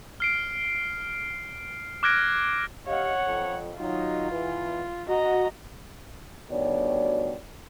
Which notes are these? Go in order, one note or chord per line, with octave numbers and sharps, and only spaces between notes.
F6 C7 D7
D6 F6 F#6 G#6 A#6 D7
G4 C#5 D#5 F5 F#5
F2
D#3 F#3 D#4 F4
E2 E3
F#4 D#5 A#5
D2 B2 D#3 G3 C#5 D5